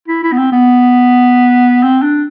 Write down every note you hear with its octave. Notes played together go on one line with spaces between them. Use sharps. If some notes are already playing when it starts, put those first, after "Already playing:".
E4
E4
B3
C4
B3
C4
D4